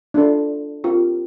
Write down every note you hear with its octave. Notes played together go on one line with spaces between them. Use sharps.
D4 F4 A4
C4 F4 G4 A#4 F5